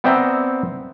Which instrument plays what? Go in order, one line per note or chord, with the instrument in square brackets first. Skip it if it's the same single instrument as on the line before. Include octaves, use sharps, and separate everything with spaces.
[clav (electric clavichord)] B3 C4 D5 E5 G5 A#5